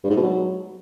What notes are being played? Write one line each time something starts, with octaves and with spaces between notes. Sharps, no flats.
G2
G#2
B2
F#3